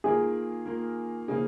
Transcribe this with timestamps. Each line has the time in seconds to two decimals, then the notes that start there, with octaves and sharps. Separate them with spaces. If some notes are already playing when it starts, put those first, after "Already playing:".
0.04 D#3 A#3 F4 G#4 A#4
0.66 D#3 A#3 F4 A#4
1.28 C#3 F3 A#3 D#4 G#4